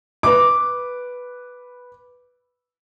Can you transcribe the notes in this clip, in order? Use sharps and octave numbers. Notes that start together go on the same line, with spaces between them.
B4 D6